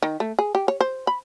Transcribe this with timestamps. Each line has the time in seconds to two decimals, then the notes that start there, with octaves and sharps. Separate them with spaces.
0.03 D#3
0.20 A3
0.39 G#4
0.55 G4
0.68 C#5
0.81 C5
1.07 B5